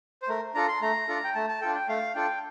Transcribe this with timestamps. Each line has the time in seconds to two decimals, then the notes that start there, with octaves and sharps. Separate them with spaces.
0.23 C5
0.28 A3 A#4
0.55 D4 F4 A4 A#5
0.68 C6
0.81 A3 A#5
1.08 D4 F4 A4
1.24 G5
1.35 A3 A5
1.49 A5
1.61 D4 F4 A4 G5
1.75 G5
1.88 A3 F5
2.15 D4 F4 A4 G5